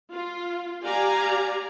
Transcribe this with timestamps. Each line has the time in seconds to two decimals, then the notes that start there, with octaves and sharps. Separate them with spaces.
0.11 F4
0.83 G4 D5 F5 G#5 A#5